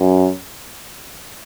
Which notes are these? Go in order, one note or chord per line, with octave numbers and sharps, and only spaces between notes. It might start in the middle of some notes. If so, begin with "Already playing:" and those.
Already playing: F#2